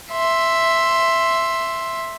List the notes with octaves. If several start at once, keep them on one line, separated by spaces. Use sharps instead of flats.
E5 C6